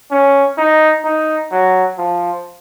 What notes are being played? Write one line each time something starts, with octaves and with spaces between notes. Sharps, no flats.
C#4
D#4
D#4
F#3
F3